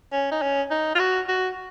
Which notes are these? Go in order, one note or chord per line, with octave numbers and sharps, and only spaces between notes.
C#4
D#4
C#4
D#4
F4
F#4
F#4